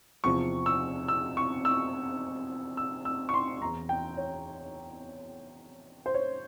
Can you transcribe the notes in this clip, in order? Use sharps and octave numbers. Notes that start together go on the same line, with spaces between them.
E2 C3 F3 C#6
E6
E6
C#6
E6
E6
E6
C#6
C6
E2 E3 A#5
G5
C#5
C5
C#5